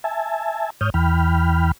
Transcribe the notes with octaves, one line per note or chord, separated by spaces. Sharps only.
E5 G#5 A5
G#2 C#5 D#6 F6 G6
E2 E3 G5 B5 F6